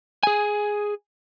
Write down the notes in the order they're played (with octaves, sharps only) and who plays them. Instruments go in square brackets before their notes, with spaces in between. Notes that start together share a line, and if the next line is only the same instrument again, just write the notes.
[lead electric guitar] G#4 G#5